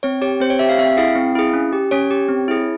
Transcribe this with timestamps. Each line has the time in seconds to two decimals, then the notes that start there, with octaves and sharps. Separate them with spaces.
0.03 C4 C#5
0.22 G4 C#5
0.40 C4 C5
0.50 C#5
0.59 G4 E5
0.69 F5
0.78 C4 E5
0.97 E4 G#4 F5
1.16 C4
1.35 E4 G#4
1.53 C#4
1.73 G4
1.91 C#4 C#5
2.11 G4
2.28 C4
2.48 E4 G#4